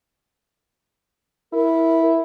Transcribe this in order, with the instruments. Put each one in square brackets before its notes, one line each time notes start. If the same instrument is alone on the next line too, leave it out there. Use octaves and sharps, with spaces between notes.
[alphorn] E4 [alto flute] A#4